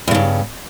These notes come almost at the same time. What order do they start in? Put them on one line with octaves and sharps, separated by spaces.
E2 C#3 G2